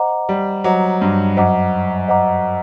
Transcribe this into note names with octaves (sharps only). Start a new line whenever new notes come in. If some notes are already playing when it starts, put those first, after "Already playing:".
Already playing: C5 D#5 F#5 A#5 D6
G3
F#3 C5 D#5 F#5 A#5 D6
G2
F#2 C5 D#5 F#5 A#5 D6
C5 D#5 F#5 A#5 D6